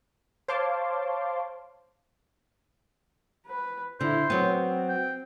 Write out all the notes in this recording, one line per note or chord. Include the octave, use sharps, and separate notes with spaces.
C5 C#5 F5 A5 C6 D6
B4
D3 E4 C5
F#3 B3 C4
G5